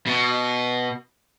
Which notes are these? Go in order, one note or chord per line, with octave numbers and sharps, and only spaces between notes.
B2